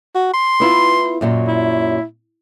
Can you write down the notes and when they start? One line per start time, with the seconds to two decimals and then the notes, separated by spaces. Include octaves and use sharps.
0.15 F#4
0.34 C6
0.60 B3 E4 F4
1.21 F#2 A#2 F#3
1.47 E4